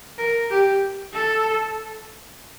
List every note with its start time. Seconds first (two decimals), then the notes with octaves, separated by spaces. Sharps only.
0.18 A#4
0.50 G4
1.13 A4